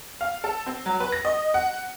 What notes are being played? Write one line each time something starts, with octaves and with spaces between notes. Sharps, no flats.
F5
A4
C4
F#3
B4
A#6
D#5
F#5